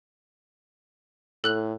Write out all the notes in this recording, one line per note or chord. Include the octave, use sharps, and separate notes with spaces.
A2 A4 F#6 F#7